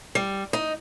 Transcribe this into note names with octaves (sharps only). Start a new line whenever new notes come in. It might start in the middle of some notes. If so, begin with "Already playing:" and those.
G3
D#4